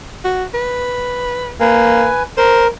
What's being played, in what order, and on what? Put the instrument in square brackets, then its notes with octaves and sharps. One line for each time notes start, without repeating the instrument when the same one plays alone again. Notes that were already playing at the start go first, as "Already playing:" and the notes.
[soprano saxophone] F#4
B4
[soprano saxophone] A#3 [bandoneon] B4 G#5
[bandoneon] A#4 [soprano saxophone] C5